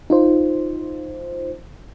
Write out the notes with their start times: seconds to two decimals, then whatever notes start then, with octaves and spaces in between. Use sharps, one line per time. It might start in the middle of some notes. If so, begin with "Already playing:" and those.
0.10 D#4 F4 C5